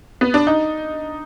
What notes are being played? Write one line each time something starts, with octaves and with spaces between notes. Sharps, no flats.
B3
D4
D#4